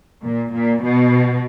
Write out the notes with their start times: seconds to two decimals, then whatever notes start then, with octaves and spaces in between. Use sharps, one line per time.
0.22 A#2
0.53 A#2
0.82 B2